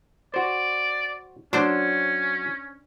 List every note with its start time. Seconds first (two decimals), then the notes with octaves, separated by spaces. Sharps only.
0.34 F#4 C5 D5
1.53 F#3 C#4 D4 C5